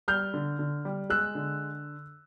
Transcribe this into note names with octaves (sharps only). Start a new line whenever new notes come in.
G3 F6 G6
D3
D3
G3
G#3 E6 F#6
D3